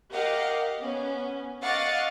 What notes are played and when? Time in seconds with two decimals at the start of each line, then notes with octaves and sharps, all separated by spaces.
0.10 G4 A#4 D#5 F5 F#5
0.81 B3 C#4
1.62 D#5 F5 F#5 C#6 D6 A6